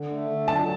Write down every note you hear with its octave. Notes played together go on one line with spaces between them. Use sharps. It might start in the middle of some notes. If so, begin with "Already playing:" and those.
Already playing: D3
A3
D3
F#3 A5